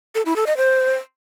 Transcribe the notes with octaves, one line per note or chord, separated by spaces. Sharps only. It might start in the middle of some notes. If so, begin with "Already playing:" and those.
A4
E4
A4
D#5
C5